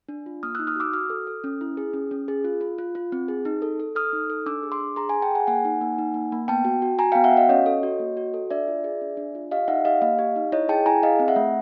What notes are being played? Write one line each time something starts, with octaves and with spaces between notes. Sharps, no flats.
D4
F4
A#3 D#6 F6
D#4 E6 F#6
D#6 F6
F#4 D6 E6
F#4 D#6 F6
A4
A4
C#4
E4
G#4
C#4
C#4
G#4
F4
F4
F4
F4
C4
G#4
D#4
A4
A4
A4 D#6 F6
D#4
A4
D4 D6 E6
G#4
C6 D6
D4
G#4 A#5 C6
G#4 G#5 A#5
G5 A5
G#4 F#5 G#5
A#3 F#5 G#5
D#4
A#3
D#4
A#3
A#3
B3 G5 A5
F#4
F#4
F#4 G#5 A#5
B3 F5 G5
E5 F#5
F#4 D#5 F5
C#4 C#5 D#5
A4
F#4
A#3
F#4
A4
D4 D5 E5
F4
G#4
D4
D4
F4
G4 D#5 F5
D#4 E5 F#5
G4 D#5 F5
A#3 D#5 F5
G4
D#4
E4 C#5 D#5
G#4 G5 A5
E4 G#5 A#5
G#4 D#5 F5
C4
E5 F#5
A3